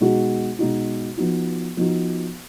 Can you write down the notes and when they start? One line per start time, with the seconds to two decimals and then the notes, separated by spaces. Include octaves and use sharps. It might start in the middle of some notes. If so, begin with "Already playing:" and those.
0.01 B2 G#3 D#4 F#4
0.59 B2 G#3 D#4 F#4
1.17 F3 B3 D#4 F#4
1.77 F3 B3 D#4 F#4